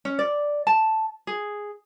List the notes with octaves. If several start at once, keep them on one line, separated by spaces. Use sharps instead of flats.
C#4
D5
A5
G#4